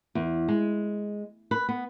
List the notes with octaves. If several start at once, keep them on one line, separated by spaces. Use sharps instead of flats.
E2
G#3
B4
B3